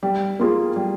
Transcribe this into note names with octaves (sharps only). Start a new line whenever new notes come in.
G3
A#3 F4 G#4
G3